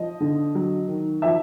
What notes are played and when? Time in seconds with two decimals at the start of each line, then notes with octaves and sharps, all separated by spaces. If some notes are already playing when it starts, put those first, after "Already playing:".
Already playing: F3 D#5
0.21 D3
0.55 F#3
0.88 D#3
1.22 F3 E5